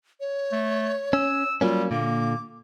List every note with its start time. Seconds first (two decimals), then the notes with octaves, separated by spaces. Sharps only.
0.20 C#5
0.52 A3
1.13 C#4 E6
1.61 F#3 G3 A#3 C#4 F4
1.91 A#2 D3 A#3 D6